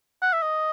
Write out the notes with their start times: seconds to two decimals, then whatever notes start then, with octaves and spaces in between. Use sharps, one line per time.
0.22 F#5
0.33 E5
0.42 D#5